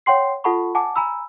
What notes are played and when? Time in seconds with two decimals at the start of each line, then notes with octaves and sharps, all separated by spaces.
0.06 C#5 F#5 G5 C6 C7
0.44 F4 A4 F#5 A5 B5 C#6
0.75 F#5 G#5 A5 D6
0.96 G#5 A#5 B5 E6